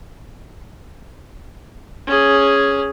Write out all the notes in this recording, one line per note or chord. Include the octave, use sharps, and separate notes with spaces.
C#4 G#4